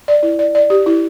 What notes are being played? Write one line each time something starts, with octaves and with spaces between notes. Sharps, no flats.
D5
E4
D5
D5
G4
E4